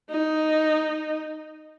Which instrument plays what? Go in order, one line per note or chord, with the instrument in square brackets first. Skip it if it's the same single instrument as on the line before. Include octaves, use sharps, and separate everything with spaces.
[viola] D#4